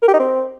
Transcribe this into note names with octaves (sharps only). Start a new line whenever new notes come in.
A#4
G4
D#4
C4